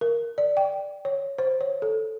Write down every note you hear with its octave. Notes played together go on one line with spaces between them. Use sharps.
A#4
D5
G5
C#5
C5
C#5
A4